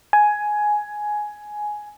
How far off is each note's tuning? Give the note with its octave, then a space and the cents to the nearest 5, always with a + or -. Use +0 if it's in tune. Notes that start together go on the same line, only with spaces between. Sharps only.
G#5 +10